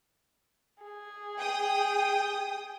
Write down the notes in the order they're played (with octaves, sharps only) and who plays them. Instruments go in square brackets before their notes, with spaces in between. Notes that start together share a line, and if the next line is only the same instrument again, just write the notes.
[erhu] G#4
[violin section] G5 D#6